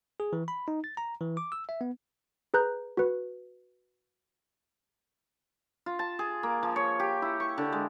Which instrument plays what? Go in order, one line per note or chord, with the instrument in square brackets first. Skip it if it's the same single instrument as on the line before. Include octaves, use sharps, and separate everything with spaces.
[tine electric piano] G#4
E3
B5
D#4
A6
A#5
E3
D6
E6
E5
B3
[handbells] G#4 B4 A#5 F#6 G6
F#4 B4
[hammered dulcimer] F4
A5
G#4
A#3
F3
C#5
G4
E4
C#6
D3
G#3